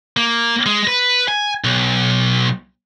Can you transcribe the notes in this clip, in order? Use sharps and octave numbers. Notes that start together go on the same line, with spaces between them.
A#3
G#3
B4
G#5
B1